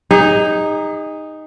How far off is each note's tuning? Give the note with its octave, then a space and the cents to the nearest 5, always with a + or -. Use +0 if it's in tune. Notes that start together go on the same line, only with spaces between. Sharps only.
D#4 +0 G#4 -40